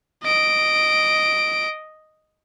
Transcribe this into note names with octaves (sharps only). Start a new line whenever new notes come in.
D#5 D7